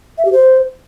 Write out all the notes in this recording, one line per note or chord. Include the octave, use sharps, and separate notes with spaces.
E5
G4
C5